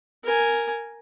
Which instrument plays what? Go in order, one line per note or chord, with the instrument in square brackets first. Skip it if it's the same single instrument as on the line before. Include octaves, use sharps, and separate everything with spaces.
[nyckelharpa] A#4 G#5